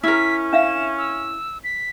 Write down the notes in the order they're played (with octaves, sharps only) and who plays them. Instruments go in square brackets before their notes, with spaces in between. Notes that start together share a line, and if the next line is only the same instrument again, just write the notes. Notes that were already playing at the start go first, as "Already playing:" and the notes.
[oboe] C#4 [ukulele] E4 A#4 [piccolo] B6
[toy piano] D4 E5 F5 [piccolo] E7
[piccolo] E6
B6